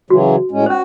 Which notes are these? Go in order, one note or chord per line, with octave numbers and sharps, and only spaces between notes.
C#3 E3 F#3 F#4
A2 G#3 C#4
C#4 F#4 C5